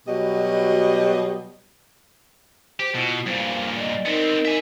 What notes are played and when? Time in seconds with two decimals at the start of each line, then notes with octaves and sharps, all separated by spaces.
0.08 B2 F#3 G3 D#5
2.80 G4 C5
2.95 B2 E4 F4
3.26 G2 A#2 C5 F5
3.76 D5 D#5
4.06 B3 C4 D#4 A#4 D#5
4.45 E5 G#5